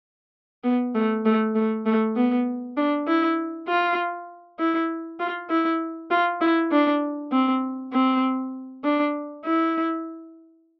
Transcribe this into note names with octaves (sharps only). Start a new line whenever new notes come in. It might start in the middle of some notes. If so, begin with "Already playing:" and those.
B3
A3
A3
A3
A3
B3
D4
E4
F4
E4
F4
E4
F4
E4
D4
C4
C4
D4
E4